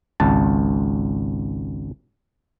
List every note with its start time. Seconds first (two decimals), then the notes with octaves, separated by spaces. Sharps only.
0.20 G#1 C#2 A5